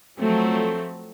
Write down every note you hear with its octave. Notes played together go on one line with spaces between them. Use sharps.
F3 F#3 A3 C4